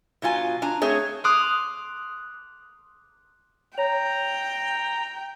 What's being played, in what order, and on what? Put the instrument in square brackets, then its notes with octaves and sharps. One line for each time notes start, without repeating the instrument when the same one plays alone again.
[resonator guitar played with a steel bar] B2 F#3 F4 G#5
D4 G#5 A#5
A3 C4 G#4 C#5
[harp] C6 D6 D#6 F6 F#6
[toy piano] C#5 [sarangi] G5 [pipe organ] A#5